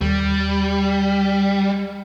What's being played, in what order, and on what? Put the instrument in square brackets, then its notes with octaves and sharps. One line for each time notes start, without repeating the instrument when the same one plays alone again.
[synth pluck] D#2 [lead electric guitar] G3